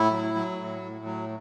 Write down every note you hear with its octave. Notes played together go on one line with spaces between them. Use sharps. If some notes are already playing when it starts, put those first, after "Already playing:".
Already playing: A2 E4
F#3
F#3
A2
A2
F#3